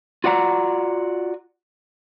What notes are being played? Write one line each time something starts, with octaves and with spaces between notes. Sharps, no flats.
F4 F#4 D5 F#5 A#5